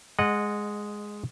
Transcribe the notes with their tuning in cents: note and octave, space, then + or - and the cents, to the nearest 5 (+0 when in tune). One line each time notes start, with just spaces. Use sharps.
G#3 +0 D#5 -20 F#5 -10